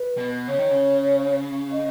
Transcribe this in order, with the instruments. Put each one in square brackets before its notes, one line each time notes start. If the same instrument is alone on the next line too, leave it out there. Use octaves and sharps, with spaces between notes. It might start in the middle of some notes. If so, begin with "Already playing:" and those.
Already playing: [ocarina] B4
[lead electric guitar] B2
[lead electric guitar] C#3 [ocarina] C#5
[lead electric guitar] D#3
C#3
[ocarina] D#5